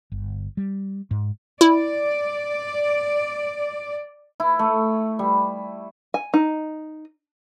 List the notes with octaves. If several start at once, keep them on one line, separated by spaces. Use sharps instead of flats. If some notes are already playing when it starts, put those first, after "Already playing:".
G1
G3
G#2
E4 D5
E4
A3
G3
G#5
D#4